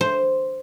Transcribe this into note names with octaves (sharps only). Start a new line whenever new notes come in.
C5